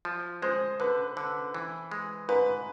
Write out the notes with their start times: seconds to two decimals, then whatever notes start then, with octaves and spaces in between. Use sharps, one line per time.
0.05 F3
0.42 G#3 C5
0.80 D3 B4
1.17 D3
1.54 E3
1.91 G#3
2.29 G#2 B4